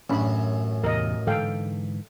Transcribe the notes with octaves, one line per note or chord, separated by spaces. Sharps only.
A1 F#2 C#4 D4 B5
E2 C3 A#4 D#5
G#2 D3 E3 A4 F5 G5